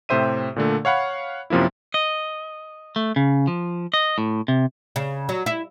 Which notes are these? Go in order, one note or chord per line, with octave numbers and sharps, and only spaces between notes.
A2 C3 G4 C5 E5 D#7
A#2 D3 A3
C#5 F5 F#5 B5
F#2 C3 F3 A#3 E4
D#5
A3
C#3
F3
D#5
A2
C3
C#3
F#3
E4